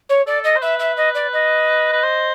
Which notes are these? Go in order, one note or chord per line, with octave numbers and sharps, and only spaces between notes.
C#5
A4 D5
D#5
C5
B4 E5
E5
D#5
D5
D#5
B4
C5